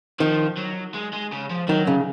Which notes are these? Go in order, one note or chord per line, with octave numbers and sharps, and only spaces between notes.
D#3 F3
F#3
G#3
G#3
C#3
F3
D#3 F#3
C#3